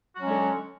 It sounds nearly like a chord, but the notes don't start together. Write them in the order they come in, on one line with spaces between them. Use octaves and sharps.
F#4 F#3 C#4 G#3 D3